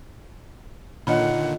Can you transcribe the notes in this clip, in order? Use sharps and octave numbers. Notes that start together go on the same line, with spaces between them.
A#2 D3 D#3 F4 C#5 D#5 F#5 B5